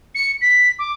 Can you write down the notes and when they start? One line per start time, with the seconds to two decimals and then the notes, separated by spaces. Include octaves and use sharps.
0.15 C#7
0.41 B6
0.79 D6